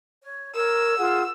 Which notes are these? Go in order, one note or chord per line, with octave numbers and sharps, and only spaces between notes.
C#5
A#4 C#5 E6
F4 G#4 F#5